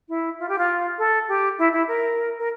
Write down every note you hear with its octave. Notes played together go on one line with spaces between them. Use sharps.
E4
F4
G4
F4
A4
G4
E4
E4
A#4
A#4